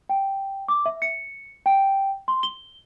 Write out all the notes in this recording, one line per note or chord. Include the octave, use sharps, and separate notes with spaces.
G5
D6
E5
C#7
G5
C6
G7